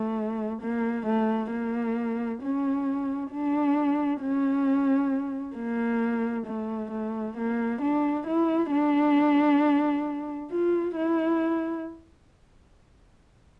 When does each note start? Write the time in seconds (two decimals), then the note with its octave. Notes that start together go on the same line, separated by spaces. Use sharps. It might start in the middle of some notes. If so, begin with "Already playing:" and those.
Already playing: A3
0.62 A#3
1.06 A3
1.51 A#3
2.42 C#4
3.32 D4
4.21 C#4
5.56 A#3
6.47 A3
6.91 A3
7.37 A#3
7.82 D4
8.27 E4
8.72 D4
10.51 F4
10.96 E4